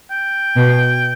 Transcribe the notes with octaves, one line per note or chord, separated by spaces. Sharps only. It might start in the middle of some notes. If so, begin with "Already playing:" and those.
G5
B2